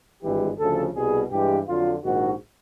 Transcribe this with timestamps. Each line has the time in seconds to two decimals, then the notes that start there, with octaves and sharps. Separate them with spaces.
0.22 G#1 G2 E3 G#3 G4
0.59 D2 C#3 F3 A4
0.94 C2 B2 G3 G#4
1.31 G2 E3 G#3 G4
1.67 F2 D3 F#3 F4
2.04 A#1 G#2 D#3 F#4